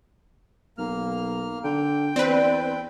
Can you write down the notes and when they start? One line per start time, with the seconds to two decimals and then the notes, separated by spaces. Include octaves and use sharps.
0.78 B1 A#3 F6
1.64 D3 G5
2.16 E2 C4 B4 D5